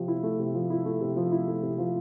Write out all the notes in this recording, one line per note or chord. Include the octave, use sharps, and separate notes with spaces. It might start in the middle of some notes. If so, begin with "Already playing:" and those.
Already playing: C3 F3
E4
A3
C3
F3
E4
A3
C3
F3
E4
A3
C3
F3